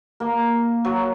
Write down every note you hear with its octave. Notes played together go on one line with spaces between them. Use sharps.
A#3
F#3